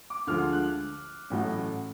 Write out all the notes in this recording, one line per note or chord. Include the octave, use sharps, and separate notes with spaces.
D6
D2 D3 F3 G#3 F6
F#6
A1 A2 F#3 A3